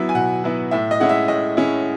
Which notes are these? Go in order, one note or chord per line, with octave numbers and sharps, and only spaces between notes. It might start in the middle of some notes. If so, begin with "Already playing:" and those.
Already playing: F#3 B3 E4
G#5
B2 F#5
F#3 B3 E4
A2 E5
D#5
G#3 C#4 E4 F#5
E5
A2 D#5
G#3 C#4 E4